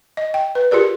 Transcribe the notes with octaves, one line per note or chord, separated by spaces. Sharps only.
D#5
G5
B4
F4 G4 G#4 A#4 D5